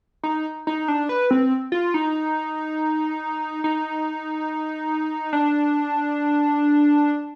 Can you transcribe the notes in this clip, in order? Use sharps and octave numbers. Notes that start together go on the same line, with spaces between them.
D#4
D#4
D4
B4
C4
F4
D#4
D#4
D4